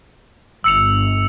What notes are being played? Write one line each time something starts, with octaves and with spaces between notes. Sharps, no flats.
G1 E6 C#7 F7